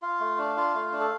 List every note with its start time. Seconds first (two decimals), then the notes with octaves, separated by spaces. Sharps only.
0.02 F4 F5
0.20 A3
0.38 D4
0.57 F4
0.74 A3
0.92 D4
1.00 A4